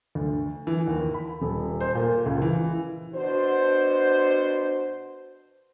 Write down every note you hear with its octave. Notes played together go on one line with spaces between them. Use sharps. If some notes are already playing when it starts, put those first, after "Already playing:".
D2
E3
D#2
B5
D#1
C5
A#2
C#2
E3
B2 D4 F#4 C5